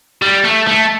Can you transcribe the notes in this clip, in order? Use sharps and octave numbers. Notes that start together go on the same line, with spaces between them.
G3
A3
A3